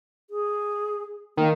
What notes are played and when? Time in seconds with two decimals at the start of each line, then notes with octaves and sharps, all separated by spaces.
0.30 G#4
1.37 D#3 A#3